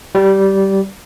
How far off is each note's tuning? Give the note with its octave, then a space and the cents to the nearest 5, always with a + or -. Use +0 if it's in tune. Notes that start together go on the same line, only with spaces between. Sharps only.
G3 -15